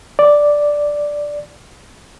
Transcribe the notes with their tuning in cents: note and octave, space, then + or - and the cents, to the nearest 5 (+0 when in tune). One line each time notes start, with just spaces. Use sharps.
D5 +0